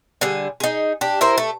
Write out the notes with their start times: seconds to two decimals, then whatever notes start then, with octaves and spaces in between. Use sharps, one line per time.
0.21 D3 G3 G#4
0.60 D#4 G#4
1.01 D4 G4
1.21 E4 A#4 C5
1.38 A3